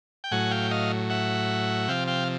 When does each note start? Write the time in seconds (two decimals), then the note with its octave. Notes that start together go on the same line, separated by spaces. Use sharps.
0.24 G5
0.31 A2 F#3 F#5 G#5
0.51 F5 G5
0.71 D#5 F5
1.10 E5 F#5
1.88 C3 F3 F5 G5
2.07 F5 G5